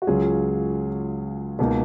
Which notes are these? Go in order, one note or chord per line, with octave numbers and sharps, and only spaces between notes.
F#4
C#2 C#3 F#3 C#4 F4 G#4
C#2 B2 A#3 D#4